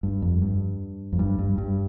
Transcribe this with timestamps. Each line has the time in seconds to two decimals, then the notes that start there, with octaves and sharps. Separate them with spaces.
0.03 G2
0.22 F2
0.42 G2
1.13 F2
1.19 G2
1.39 G2
1.58 G2